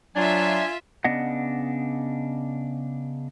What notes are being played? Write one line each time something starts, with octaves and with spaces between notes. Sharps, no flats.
F#3 D4 F4 E5 G#5
C#3 B3 D4 D#5 F#5